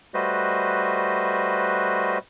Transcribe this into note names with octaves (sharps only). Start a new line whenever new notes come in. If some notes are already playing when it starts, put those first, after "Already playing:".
G3 A3 F#4 B4 C5 D#5